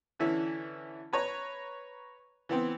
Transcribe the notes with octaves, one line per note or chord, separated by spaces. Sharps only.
D3 E3 C#4 E4
B4 C#5 A#5
E3 B3 C4